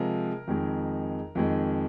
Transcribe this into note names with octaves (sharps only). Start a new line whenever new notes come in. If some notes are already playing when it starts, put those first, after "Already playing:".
Already playing: C3 F3 G#3 A#4
F2 D#3 G#3
F2 D#3 G#3